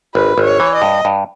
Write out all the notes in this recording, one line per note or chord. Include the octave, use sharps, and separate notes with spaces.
G#1 B4
G#1
C#5
E3
D#5
G2
G2